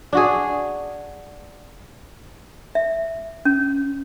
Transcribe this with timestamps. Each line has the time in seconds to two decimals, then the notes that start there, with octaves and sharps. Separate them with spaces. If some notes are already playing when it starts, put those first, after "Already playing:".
0.13 D4 F#4 G#4
2.75 E5
3.45 C#4